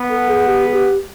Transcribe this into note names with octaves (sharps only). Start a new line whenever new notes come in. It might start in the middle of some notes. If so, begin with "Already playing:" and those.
Already playing: B3
A4
G#4
G4
G#4
G4